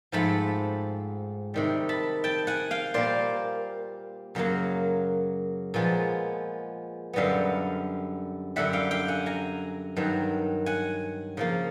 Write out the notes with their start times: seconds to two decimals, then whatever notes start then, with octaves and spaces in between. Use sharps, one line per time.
0.12 G#2 F3 A3 C4 A5 B5
1.54 C3 D#3 G3
1.89 A5 B5
2.24 G5 A5
2.47 F#5 G#5
2.71 F5 G5
2.94 A#2 G3 A#3 C5 D5
4.35 F#2 C#3 F#3 A#3
5.74 A#2 F3 G#3 B3
7.13 F#2 D3 G3 B3 D#5 F5
8.56 F#2 D3 G3 E5 F#5
8.73 F5 G5
8.91 F5 G5
9.08 F#5 G#5
9.26 G#5 A#5
9.96 G2 D#3 F#3
10.66 F#5 G#5
11.37 C#3 F3 A#3